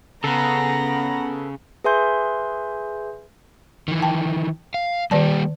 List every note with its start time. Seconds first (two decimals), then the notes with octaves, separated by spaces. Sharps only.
0.24 C#3 B3 A4 B4 F#5 A#5
1.84 G#4 B4 E5 G#5 C6 G6
3.88 D#3 E3
4.02 G5 A5
4.74 F5
5.11 D#3 G3 A#3 G4 D5 A5